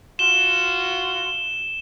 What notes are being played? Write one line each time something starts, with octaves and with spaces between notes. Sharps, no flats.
F4 F#4 E7 G7